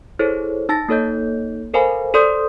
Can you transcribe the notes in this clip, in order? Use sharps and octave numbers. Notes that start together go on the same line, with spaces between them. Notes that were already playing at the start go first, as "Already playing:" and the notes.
E4 G#4 A4 C5 C#5
D#4 A5 A6 A#6
A#3 D#4 A4 C#5 D#5 G6
A4 A#4 C5 F5 G#5 B5
A4 C5 D5 C6 D#6 G6